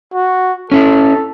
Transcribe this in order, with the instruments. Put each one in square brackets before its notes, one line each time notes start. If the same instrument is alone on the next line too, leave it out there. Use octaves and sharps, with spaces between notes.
[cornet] F#4
[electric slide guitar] C#4 E4 [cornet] A4